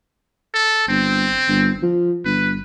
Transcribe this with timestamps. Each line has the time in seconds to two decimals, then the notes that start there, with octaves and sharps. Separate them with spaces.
0.54 A4
0.89 G1 C4
1.48 G1
1.83 F3
2.25 G1 B4